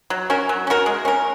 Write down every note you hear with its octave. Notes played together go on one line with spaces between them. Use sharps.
F#3
C#4 F#4 A#4
F#3
C#4 F#4 A#4
G#3
C#4 A#4